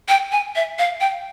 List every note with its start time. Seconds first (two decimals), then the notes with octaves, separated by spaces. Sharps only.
0.09 G5
0.32 G#5
0.56 E5
0.79 F5
1.01 G5